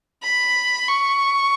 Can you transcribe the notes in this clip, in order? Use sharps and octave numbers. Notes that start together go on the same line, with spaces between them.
B5
C#6